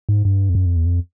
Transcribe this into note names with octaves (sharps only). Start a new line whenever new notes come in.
G#2
G2
F2
F#2
F2
E2
F2